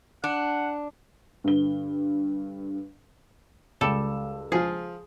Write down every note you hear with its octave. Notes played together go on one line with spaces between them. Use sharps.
D4 F#5
G2 D3 B4 G7
C#2 G3 A4 E7
F3 F4 G#4